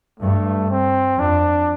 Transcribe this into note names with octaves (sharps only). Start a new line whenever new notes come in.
G2 A3
C4
F2 D4